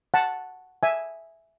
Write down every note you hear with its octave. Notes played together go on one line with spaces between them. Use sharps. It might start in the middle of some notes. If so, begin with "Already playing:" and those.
F#5 A5
E5 G#5